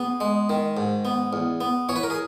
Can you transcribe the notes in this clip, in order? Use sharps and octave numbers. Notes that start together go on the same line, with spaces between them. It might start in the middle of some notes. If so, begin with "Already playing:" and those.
Already playing: B3 G#4
G#3
D#3
G#2
B3
E2
B3
E3 C#5
B4
A#4
G#4